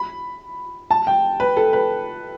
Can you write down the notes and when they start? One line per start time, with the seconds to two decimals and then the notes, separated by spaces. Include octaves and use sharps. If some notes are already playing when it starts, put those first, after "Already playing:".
Already playing: B5
0.91 A5
1.07 G5
1.40 B4
1.57 A4
1.73 B4